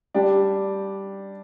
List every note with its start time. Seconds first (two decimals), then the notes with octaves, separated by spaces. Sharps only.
0.14 G3 D4 G4